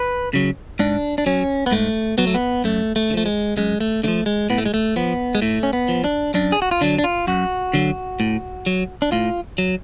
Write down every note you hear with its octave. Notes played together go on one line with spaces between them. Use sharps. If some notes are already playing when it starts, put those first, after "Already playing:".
Already playing: B4
C#3 F#3
G#2 D4
D4
F#3 C#4
B3
G#2 A3
F#3 B3
A3
B3
F#2 A3
A3
D3
F3 A3
G#3
F#2 G#3
A3
D3 F3 A3
G#3
A2 B3
A3
G#3
A3
F3 B3
G#3
A2 A3
C#4
B3
F3
D4
F#2 D4
G#4
F#4
F4
D3 F#3 D4
D4
F4
F#2 F#4
D3 F#3
A2
F#3
D4
A2 F4
F#3